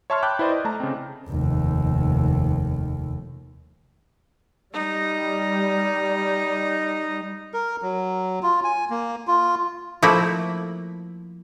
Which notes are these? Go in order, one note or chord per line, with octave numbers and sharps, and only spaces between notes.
C#5 E5 A5 C6 C#6 F6
G5 A5 B5 D6 F#6 G6
E4 B4 C5 D5 D#5
D#5
A3 A5 A#5
C#3 C4
F1 D#2
G3 D#4
A#4
F#3
F4
G#5
A#3
F4
F3 A3 A#3 E4